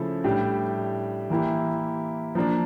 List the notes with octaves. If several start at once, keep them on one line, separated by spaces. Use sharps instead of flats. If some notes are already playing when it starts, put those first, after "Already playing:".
Already playing: C#3 F3 A3 E4 A4
A2 G3 D4 G4
E3 A#3 E4 G4
F3 A#3 D4